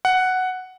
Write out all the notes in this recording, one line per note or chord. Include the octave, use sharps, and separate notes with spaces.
F#5